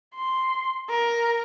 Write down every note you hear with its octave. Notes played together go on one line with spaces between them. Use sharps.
C6
A#4